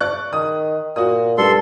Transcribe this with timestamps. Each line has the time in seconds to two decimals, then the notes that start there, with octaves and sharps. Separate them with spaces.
0.01 D5 C#6 F#6
0.33 D#3 D#6
0.96 A#2 F#4 D#6
1.38 G2 G3 A4 C6